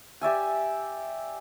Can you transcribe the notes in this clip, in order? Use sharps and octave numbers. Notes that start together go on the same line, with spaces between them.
G4 D5 E5 G#5